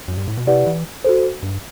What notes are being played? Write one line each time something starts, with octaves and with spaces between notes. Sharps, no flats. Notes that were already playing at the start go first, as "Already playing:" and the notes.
F#2
G2
A2
B2
C3 E4 G4 B4 D5 F#5
E3
F#4 A4 C5
G2